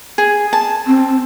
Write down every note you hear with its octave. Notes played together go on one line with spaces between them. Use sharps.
G#4
A5
C4